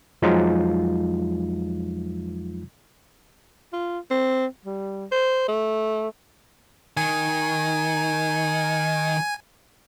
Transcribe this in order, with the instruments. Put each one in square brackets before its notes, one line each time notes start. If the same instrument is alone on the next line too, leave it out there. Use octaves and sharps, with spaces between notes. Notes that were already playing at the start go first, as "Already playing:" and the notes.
[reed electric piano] F2 F3 F#3 G#3 D#4 F4
[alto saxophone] F4
C4
G3
C5
A3
[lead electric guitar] D#3 [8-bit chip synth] G#5